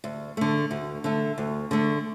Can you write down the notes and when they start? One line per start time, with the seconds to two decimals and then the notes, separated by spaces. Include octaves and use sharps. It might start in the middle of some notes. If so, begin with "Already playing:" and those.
0.04 D2
0.37 D3 A3
0.71 D2
1.04 D3 A3
1.38 D2
1.71 D3 A3